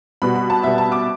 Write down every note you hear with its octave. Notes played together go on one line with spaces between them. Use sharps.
B2 G3 B3 B5
B5
A5
B2 G3 B3 E5
A5
D6